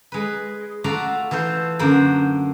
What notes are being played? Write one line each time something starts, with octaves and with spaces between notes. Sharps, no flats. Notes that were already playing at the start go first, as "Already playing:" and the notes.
G#3 B4
A3 F4 F#4 D5 F5 A#5
E3 F4 A4 C5
F#2 D3 A#3 C5